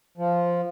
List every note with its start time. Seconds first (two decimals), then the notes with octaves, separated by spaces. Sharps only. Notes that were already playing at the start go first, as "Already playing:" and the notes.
0.18 F3